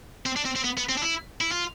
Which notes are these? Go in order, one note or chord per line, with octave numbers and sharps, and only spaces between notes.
C4
D4
C4
C4
B3
B3
C4
D4
E4
E4
F4